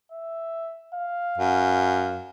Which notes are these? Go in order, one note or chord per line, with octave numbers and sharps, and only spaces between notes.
E5
F5
F#2